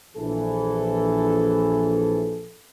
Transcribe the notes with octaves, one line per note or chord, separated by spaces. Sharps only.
A#1 E3 A4